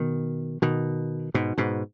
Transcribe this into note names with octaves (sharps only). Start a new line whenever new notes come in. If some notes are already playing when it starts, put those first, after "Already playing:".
Already playing: B2 D#3
B2 D#3
G#2 B2
G#2 B2